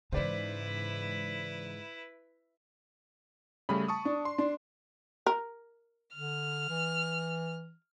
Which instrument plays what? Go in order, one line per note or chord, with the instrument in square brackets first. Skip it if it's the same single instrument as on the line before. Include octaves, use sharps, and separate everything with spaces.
[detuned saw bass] G#2 [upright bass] C#3 E3 [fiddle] E4 B4 [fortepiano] C5 D5
[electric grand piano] C#3 G3 A3 [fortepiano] B5
[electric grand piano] A5 C#6 D#6
[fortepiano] D4
[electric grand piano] C6
[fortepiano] D4
[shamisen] A#4
[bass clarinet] D3 [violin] F6
[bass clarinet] E3